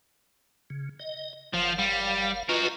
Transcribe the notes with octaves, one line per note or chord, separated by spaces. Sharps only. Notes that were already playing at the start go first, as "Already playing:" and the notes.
C#3
D#5
F#1 F3 F5
G3
F4 F#4 A#4 B4 D#5